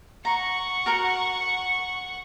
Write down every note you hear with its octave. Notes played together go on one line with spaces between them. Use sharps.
F#5 A#5 C#6
F#4 A#4 A#5